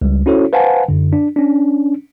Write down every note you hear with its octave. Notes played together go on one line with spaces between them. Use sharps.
C#2 G3
C#4 E4 F#4 A4 C5 C#5
B4 C5 F5 F#5 G#5 A5
F#2 D3
D4
C#4 D4